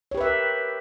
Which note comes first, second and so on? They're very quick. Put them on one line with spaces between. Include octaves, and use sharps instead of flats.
C#5 G4 B4 E5 A#4